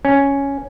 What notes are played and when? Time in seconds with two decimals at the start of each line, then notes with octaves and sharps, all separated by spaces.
0.05 C#4